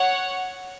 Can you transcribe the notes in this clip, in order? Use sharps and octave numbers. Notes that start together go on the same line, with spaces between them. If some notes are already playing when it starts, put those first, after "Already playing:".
Already playing: C#5 F#5